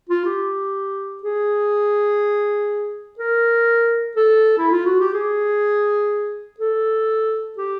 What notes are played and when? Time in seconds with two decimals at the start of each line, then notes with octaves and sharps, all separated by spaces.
0.09 F4
0.26 G4
1.23 G#4
3.19 A#4
4.16 A4
4.58 E4
4.72 F4
4.86 F#4
5.00 G4
5.14 G#4
6.60 A4
7.58 G4